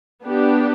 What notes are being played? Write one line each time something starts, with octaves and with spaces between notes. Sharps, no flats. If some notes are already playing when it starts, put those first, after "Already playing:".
B3 D4 G4